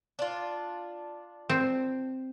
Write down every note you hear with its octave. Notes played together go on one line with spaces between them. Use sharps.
D4 F4
C4